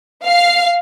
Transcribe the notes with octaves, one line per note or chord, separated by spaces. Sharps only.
F5